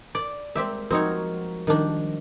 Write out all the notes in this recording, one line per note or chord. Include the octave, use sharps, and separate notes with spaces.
D5
G3 G#3 C4 G4 A#4 E5
F3 C4 D#4 F#4 A#4 C#5
D#3 F3 G3 D4